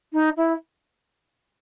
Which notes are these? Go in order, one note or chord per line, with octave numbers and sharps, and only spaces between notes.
D#4
E4